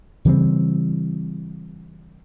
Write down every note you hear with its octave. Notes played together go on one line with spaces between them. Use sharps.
C#3 E3 G3 C4